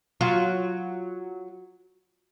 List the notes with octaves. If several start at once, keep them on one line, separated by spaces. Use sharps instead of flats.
F#3 F4